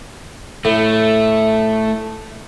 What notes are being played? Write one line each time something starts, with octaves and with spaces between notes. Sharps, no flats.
A2 A3